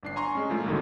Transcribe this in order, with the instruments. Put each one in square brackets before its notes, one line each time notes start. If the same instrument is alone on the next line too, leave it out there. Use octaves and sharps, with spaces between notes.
[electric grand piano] G1 D4 C7
G#5 A#5 C6 C#6
G#3 C#4
A#2 F3 A3
C2 A2 D3 D#3 F#3